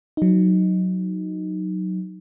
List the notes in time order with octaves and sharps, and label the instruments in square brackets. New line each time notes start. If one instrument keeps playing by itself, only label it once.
[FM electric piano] F#3 D#4